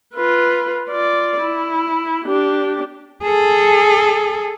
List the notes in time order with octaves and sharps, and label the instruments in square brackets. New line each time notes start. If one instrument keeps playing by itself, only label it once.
[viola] F4 B4
F4 D5
E4
D4 G4
[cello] G#4 A4